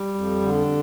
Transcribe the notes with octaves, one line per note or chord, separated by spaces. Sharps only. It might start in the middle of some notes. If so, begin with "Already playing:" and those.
Already playing: G3
F2
D3